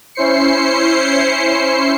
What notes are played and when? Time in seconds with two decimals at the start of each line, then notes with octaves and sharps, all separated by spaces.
0.15 C#4 E4 C5 C7 C#7